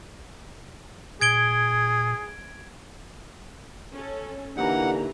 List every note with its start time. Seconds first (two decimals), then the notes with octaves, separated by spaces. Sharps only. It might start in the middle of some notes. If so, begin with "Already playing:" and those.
1.21 A#2 G#4 G#6 D7 G7
3.92 C#4 A4
4.57 D3 E3 A#3 D4 D#4 G4 F#5 A#5